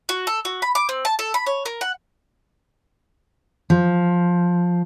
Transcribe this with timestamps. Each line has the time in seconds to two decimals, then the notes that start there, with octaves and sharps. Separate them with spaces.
0.09 F#4
0.27 A4
0.45 F#4
0.62 B5
0.75 D6
0.89 C4
1.05 A5
1.19 A4
1.34 B5
1.46 C#5
1.65 A#4
1.81 F#5
3.70 F3